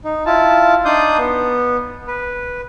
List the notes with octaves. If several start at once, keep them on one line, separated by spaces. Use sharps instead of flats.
D#4
E4 F4 A5
D4 D#4 D5 C6 D#6 G6
B3
B4